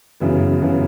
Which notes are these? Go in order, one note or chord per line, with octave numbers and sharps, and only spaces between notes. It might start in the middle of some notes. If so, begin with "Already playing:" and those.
F#2 C#3 E3 B3
F#2 C#3 E3 B3